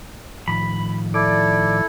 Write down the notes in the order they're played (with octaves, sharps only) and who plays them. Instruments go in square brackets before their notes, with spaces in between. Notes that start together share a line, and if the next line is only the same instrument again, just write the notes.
[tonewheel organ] A2 D#3 F3 [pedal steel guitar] B5
[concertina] E4 A4 [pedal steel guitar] D5